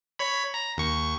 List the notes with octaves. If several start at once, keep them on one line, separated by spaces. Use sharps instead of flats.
C#5 B5
A#5
D#2 C#6